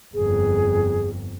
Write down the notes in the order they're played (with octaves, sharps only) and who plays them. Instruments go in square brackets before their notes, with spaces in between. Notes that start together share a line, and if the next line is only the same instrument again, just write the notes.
[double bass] G1 F2 [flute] G#4